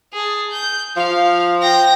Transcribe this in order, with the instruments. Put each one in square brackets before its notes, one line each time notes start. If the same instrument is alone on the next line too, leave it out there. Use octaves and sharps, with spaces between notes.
[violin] G#4 A5
G6
[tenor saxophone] F3 [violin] F5
[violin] G5 A#6